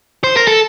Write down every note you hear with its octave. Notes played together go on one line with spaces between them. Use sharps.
C5
A#4
A4